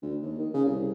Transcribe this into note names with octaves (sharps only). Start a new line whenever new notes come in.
D2
D#2
D#3
C#3
C2